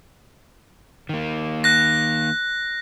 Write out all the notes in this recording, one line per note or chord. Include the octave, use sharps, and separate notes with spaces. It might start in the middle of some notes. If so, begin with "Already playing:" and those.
D#3 A#3
F#6 A#6